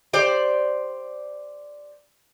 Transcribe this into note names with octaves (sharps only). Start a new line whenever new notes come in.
G4 C5 D5